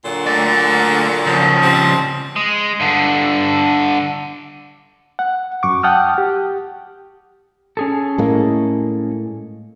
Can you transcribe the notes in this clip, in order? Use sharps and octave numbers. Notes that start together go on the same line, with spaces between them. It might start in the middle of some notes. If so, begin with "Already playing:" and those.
A#2 D3 F#3
A3 D5
C#3 F3
G3 C4
G#3
G2 D3
F#5
F#2 C#6 D6
F#5 G5 A5 D#6 F6
G4
C#4 G#4 A4
A2 G#3 A#3